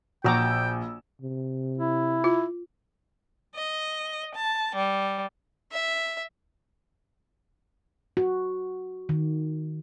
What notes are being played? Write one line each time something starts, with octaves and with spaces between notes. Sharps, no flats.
A#1 F#4 G5 A#5 D6 E6
C3
E4
F4
D#5
A5
G3
E5
F#4
D#3